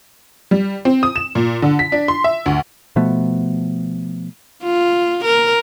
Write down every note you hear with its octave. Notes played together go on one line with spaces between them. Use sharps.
G3
C4
D#6
E7
A#2
D3
B6
D4
C6
E5
D2
B2 F3 A3 B3
F4
A#4